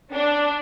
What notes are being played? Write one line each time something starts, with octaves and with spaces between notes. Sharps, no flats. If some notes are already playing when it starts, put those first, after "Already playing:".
D4